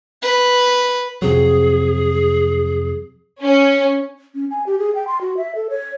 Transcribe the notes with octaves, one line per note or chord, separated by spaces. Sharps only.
B4
F2 C3 F#3 G#4
C#4
C#4
G#5
G4
G#4
G5
C6
F#4
E5
A4
C#5